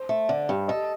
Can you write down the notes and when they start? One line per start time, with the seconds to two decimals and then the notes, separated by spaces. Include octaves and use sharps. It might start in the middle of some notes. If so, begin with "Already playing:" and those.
Already playing: C5
0.09 A3
0.29 D3 D5
0.49 G2
0.68 A4 D#5